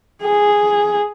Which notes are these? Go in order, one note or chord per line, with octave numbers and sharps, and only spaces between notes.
G#4